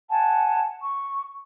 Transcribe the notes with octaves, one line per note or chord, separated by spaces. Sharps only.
F#5 G#5 A5
C#6